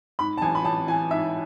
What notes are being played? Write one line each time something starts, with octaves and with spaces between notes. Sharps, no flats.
G#2 B5
A5
A1 G#5
B5
A1 A5
E3 G#5
G#2 E5